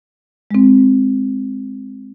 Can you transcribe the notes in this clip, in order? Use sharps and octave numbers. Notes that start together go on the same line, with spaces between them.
G#3 C4